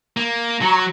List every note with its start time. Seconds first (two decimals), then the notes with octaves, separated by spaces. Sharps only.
0.17 A#3
0.61 F#3 A#5 C#6